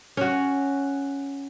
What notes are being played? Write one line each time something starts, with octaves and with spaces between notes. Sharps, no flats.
C#4 F#4